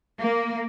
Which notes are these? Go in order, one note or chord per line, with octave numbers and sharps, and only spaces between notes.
A#3